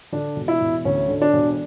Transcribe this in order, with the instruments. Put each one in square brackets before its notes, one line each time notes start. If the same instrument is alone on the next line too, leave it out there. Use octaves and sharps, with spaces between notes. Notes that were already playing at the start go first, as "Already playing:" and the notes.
[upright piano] D3 D4
E1
E4
E1
D2 C#4
D3
D4
E1